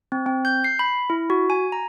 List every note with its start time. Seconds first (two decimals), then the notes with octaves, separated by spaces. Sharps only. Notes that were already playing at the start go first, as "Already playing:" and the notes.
0.12 C4
0.26 C4
0.45 G6
0.64 C7
0.79 B5
1.10 E4
1.30 F#4
1.50 G#5
1.72 A#5